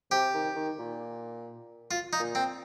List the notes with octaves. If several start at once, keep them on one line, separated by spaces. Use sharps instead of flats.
C3 G4
D#3
D#3
A#2
F4
D#4
A#2
C4